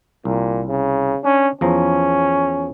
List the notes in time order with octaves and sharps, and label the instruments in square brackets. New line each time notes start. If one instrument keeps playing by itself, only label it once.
[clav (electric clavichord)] C2 [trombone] A#2
[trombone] C#3
[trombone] C#4 [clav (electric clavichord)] D4
[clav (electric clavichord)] E2 F3 A#5 [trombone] C#4